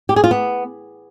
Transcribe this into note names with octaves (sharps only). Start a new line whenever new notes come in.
G4
G#4
F4
B3